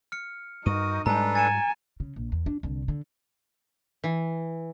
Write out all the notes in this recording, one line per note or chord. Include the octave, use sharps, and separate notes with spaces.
F6 C#7
G2 D#4 F#4 A#4 D#6 D#7
G#2 G3 G#3 D4 A4 B4 G#5 A#5
G#5 A6 C#7 E7
C#3
A#1
E2
D4
C2 D3
D3
E3